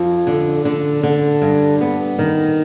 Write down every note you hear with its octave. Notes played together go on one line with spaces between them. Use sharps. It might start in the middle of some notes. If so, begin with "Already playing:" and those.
Already playing: F2
D3
D3
D3
G2
B3
D#3